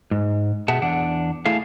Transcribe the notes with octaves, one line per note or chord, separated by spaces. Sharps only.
G#2
B2 G4 G#4 E5 F#5 A5
E2 D4 F#5
A3 E4 G#4 A4 F5